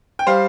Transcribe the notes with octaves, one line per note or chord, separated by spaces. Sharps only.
G5
G3 C5 F5